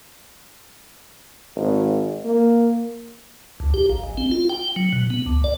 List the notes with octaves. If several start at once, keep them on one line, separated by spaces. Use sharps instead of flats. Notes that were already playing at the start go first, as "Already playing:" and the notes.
G#1
A#3
D2
G4
A#1
G#1
C4
F4
G5
F#3
B2
B3
D2
D5